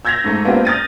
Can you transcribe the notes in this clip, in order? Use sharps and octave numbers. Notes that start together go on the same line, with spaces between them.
E6 G6 G#6 A#6 B6 F7
G#2 A3 A#5
A#3 B3 D4 F4 G4 C5
D#6 F6 G6 A6 A#6 D#7